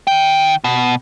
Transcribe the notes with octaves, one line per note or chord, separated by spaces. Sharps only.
D#3 G5
B2